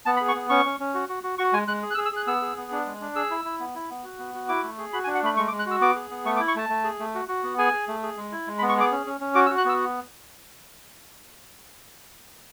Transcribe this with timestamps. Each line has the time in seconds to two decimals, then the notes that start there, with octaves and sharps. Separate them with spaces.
0.06 B3 A5
0.17 B5
0.21 G#4
0.28 C#6
0.35 B3
0.49 C#4 C#6
0.65 C#4
0.80 C#4
0.94 F#4
1.09 F#4
1.23 F#4
1.38 F#4 C#6
1.53 G#3 G#5
1.68 G#3 F#6
1.83 G#4
1.91 F#6
1.95 E6
1.97 G#4
2.05 E6
2.12 G#4 F#6
2.27 B3 E6
2.42 G#4
2.57 B3
2.72 D4
2.86 G#3
3.01 D4
3.16 G#4 E6
3.31 E4
3.45 E4
3.60 B3
3.75 E4
3.90 B3
4.04 F#4
4.19 B3
4.34 F#4
4.49 E4 D6
4.63 A3
4.78 G#4
4.93 F#4 B5
5.04 G#5
5.07 D4
5.15 F#5
5.23 A3 B5
5.37 G#3 C#6
5.48 D6
5.52 G#3
5.59 F#6
5.66 F#4 E6
5.81 B3 D6
5.95 G#4
6.10 B3
6.25 A3 C#6
6.36 D6
6.40 E4
6.48 C#6
6.56 A3 A5
6.69 A3
6.84 G#4
7.00 A3
7.15 F#4
7.28 F#4
7.43 B3
7.58 G#4 G#5
7.74 G#4
7.88 A3
8.03 G#4
8.17 G#3
8.32 E4
8.47 G#3
8.59 B5
8.62 B3
8.69 C#6
8.77 G#4 D6
8.91 C#4
9.06 C#4
9.21 C#4
9.35 F#4 D6
9.46 E6
9.50 F#4
9.58 F#6
9.65 B3 E6